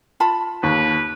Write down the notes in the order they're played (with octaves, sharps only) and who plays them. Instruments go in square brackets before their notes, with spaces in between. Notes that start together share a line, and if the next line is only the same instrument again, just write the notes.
[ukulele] F4 A5 B5
[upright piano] D#2 [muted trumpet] B4